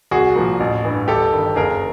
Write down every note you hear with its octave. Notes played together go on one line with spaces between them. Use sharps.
C2 F#4 G#4
A#2 F3 A#3
A1
G2 E3
G1 G4 A4
G2 D#3
F#1 G#4 A#4